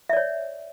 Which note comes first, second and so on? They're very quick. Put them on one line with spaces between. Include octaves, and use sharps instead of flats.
E5 D5 C#5